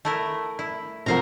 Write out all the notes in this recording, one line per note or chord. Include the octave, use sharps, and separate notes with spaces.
A3 E4 A#4
E4
C3 F3 F#3 A#4 F5 A#5